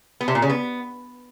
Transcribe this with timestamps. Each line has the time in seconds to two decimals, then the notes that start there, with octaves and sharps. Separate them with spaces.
0.21 B3
0.28 C3
0.35 A#2
0.42 C#3
0.50 B3